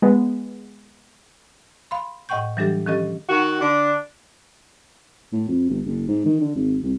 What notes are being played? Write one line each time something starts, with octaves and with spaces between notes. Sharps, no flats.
G#3 B3
F5 B5 C6
A2 D#5 F#5 G5 C#6 G6
E3 F#3 G3 D4 G4 A4
D#3 F3 C#4 G4 A4 D#5
D#3 F#4
D3 D4
A2
F2
G1
F#1
G#2
D#3
D3
G#1
C2